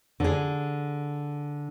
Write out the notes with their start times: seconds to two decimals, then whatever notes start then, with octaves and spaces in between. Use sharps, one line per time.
0.20 D3 G#4